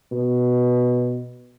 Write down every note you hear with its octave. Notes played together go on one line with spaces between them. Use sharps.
B2